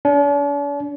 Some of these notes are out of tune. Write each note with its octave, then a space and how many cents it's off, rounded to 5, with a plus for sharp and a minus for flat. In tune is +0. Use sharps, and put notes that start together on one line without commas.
D4 -45